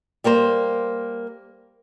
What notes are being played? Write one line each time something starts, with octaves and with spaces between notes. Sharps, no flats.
G3 A#3 A#4 C5